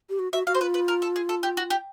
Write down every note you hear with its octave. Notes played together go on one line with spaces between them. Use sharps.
G4
F#4
F#4 E5
F#4 F5
C5
F4 B4
B4
A#4
A4
G#4
A4
G4
F#4
G4